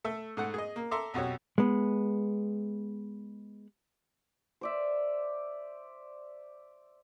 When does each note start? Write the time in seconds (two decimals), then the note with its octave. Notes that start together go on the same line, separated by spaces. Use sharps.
0.04 A3 A4 E5 E6
0.37 G#2 A3 F#5
0.54 G#4 D#5
0.76 A#3
0.91 A4 E5 A#5 C6 D6
1.14 B1 F2 F#4 G4 C#5
1.58 G#3 B3
4.61 C5 D5 E5